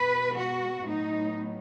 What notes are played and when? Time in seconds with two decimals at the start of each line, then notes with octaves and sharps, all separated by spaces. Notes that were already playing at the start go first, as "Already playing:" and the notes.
Already playing: B2 G#3 B3 B4
0.37 F#4
0.87 A2 F#3 B3 D#4